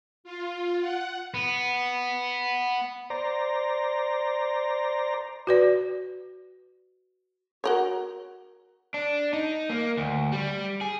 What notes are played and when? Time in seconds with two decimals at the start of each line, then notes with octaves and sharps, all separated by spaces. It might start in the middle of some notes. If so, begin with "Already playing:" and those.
0.24 F4
0.80 F#5
1.34 B3
3.10 C5 D5 A#5
5.47 F#4 B4 D5
7.64 F#4 A#4 C#5
8.94 D4
9.33 D#4
9.70 A#3
9.97 D2
10.32 G3
10.81 G#4